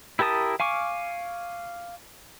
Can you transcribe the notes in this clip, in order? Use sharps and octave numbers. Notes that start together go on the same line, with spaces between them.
E4 G4 A#4 A5 D#6
F5 G#5 C#6 D6